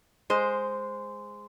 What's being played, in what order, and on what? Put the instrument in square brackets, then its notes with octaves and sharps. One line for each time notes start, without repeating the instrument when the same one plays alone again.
[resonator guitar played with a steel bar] G#3 C5